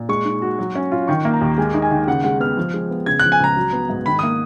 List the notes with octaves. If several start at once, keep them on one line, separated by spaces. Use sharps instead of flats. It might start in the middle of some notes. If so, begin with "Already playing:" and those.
Already playing: A#2
G#3 C#6
D#4
F#4
F#3
C#4
F4
D#3 C#6
A#3
A#5
D#2
G#3 G#5
D#4
G#5
D#3
C#3 F#5
G#3 F#5
B3 F6
F3
G#3
B3
C#3 G#6
F#6
F3
G#5
C#2 A#5
F#3
B3
G#2
D#3 B5
D#6
A#3